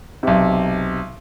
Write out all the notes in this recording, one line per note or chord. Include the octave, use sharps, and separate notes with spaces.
B1 C3